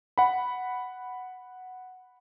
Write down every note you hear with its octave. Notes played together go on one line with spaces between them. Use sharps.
F#5 B5